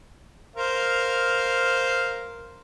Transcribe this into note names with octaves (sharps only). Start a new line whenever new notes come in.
A#4 C5 F5